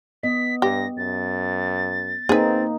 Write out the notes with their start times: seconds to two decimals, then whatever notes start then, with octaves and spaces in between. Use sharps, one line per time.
0.23 B3 D#5 B6
0.62 G2 G4 A#6
0.97 F#2 A6
2.29 A#3 C4 D#4 G#4 B4